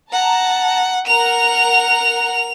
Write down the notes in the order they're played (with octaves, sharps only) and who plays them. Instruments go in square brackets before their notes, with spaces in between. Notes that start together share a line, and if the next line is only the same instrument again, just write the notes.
[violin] F#5 [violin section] A5 A#5
[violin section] A#4 F#5 [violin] F7